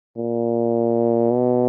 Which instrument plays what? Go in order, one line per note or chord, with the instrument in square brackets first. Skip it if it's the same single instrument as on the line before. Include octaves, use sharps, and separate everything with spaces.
[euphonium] A#2
B2